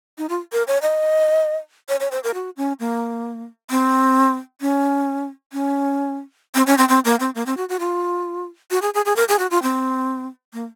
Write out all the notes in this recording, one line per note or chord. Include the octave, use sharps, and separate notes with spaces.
D#4
F4
A#4
C#5
D#5
C#5
C#5
C5
A#4
F#4
C#4
A#3
C4
C#4
C#4
C4
C#4
C4
C4
A#3
C4
A#3
C4
F#4
F#4
F4
F#4
G#4
G#4
G#4
A#4
G#4
F#4
F4
C4
A#3